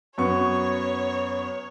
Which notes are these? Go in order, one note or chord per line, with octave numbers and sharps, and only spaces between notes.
F#2 B3 C#5 C#6